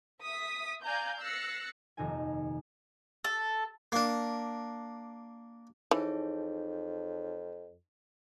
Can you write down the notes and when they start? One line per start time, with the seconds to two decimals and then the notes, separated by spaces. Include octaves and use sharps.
0.22 E5 D#6 B6
0.82 D5 F5 G#5 A#5 G6
1.20 E6 F#6 A6 A#6 C7 C#7
1.97 D#1 F2 C3 D#4 A4 G#5
3.24 A4
3.92 A#3 D4
5.91 F2 E3 D#4 G#4 C#5